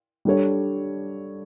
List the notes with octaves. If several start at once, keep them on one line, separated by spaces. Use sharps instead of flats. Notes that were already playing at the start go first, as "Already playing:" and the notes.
G3 D4 A4 C#5